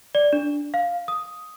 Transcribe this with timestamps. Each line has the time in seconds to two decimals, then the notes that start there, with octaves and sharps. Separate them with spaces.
0.15 D5
0.33 D4
0.74 F5
1.08 D#6